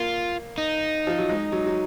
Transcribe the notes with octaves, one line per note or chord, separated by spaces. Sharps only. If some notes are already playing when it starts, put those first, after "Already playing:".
Already playing: A#3 F4
D#4
F3
F#3
G#3
F#3
F#3